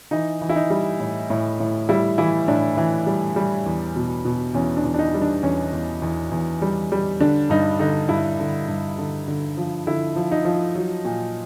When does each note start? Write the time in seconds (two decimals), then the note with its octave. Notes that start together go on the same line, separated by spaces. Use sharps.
0.11 E3 D#4
0.41 E3
0.49 E4
0.56 D#4
0.70 G3
1.00 A2
1.30 A2
1.60 A2
1.89 G3 E4
2.18 E3 E4
2.48 A2 D4
2.77 E3
3.07 G3
3.36 G3
3.66 E2
3.96 B2
4.25 B2
4.54 E2 C#4
4.77 D4
4.85 E2
4.94 D4
4.99 D#4
5.14 G3
5.22 D4
5.43 E2 C#4
5.73 E2
6.02 E2
6.32 E2
6.62 G3
6.92 G3
7.20 D3 D4
7.50 G2 D#4
7.79 D3 D#4
8.09 G2 E4
8.39 D3
8.68 G2
8.98 D3
9.28 D3
9.57 F3
9.87 D3 E4
10.16 F3
10.31 D#4
10.45 F3
10.75 F#3
11.05 A#2